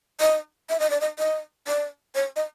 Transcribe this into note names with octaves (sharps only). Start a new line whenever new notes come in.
D#5
E5
D#5
D5
D#5
D#5
D5
C#5
D#5